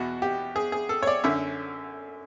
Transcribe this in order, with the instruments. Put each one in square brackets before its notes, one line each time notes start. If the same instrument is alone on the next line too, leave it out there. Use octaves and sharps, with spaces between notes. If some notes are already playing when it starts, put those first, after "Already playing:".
Already playing: [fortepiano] E2 B2 F#4
G4
G#4
G#4
A4
C#5
D5
F#2 D3 E5